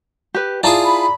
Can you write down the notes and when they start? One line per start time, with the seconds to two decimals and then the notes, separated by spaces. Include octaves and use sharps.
0.34 G4 B4
0.63 E4 F4 G#4 D5 A5 A#5
0.83 B5